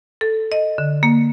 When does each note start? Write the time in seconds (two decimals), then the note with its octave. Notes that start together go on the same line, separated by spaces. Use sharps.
0.21 A4
0.52 D#5
0.78 D3
1.03 A#3